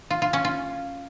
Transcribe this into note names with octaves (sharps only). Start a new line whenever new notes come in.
F4
F4
C#4
F4